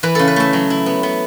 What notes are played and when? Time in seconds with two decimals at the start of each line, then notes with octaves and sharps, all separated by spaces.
0.03 E3 B4
0.15 C#3 A4
0.28 B4
0.36 A3 E5
0.53 F#3
0.70 E4
0.86 B3
1.03 B3